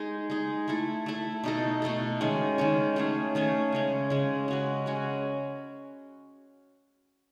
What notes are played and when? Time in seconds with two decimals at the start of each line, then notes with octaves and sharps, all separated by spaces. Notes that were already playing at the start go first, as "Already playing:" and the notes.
Already playing: G#3 D#4 G#4
0.30 G#3 D#4 G#4
0.68 A3 E4 A4
1.06 A3 E4 A4
1.44 B2 A3 D#4 A4
1.82 B2 A3 D#4 A4
2.21 D#3 G#3 C#4
2.58 D#3 G#3 C#4
2.96 D#3 A3 C#4 G#4
3.35 D#3 A3 C#4 G#4
3.72 C#3 G#3 C#4
4.10 C#3 G#3 C#4
4.48 G#3 C#4 F#4 B4
4.86 G#3 C#4 F#4 B4